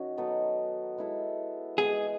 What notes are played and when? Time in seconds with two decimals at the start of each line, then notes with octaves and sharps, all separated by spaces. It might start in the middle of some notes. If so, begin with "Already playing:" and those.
Already playing: D#3 C#4 F#4
0.17 F#3 B3 D#4 A4
0.98 G#3 B3 E4 A4
1.77 E3 G#3 B3 G#4